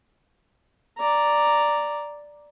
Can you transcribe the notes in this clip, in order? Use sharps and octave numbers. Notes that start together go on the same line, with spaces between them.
D5 A#5